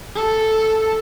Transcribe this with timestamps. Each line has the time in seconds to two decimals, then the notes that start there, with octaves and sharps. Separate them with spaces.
0.15 A4